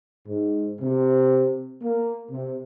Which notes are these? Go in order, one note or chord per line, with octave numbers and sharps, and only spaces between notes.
G#2
C3
A#3
C3